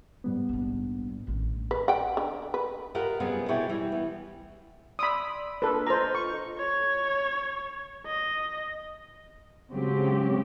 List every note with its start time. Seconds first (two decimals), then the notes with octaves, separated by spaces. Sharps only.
0.24 G#2 G3 B3
0.49 A#1 D4
1.27 A1 D#3
1.71 B4
1.88 F#5 G5
2.17 D3
2.54 B4
2.95 F4 G4 A#4 D#5 F#5
3.20 F#2 C3 G3 B3 G#4
3.48 B2 E4 G#4 C#5 D5 G5
3.69 E3 G3
3.92 B3
4.99 D5 B5 C6 D#6 E6
5.62 A#3 D4 F4 A4 B4
5.87 F4 A4 C5 D#5 A#5
6.15 C#6
6.58 C#5
8.06 D#5
9.72 G#2 C#3 F#3 C4 G4